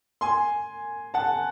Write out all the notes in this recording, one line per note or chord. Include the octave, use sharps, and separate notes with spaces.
G#5 C6
F#5 A5